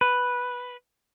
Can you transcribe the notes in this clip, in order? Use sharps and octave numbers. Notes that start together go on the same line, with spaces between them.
B4